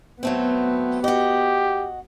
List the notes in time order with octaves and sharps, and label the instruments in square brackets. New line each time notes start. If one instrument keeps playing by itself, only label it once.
[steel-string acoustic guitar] F#3 A3 C4 [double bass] B3
[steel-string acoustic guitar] F#4 D#5 [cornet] G4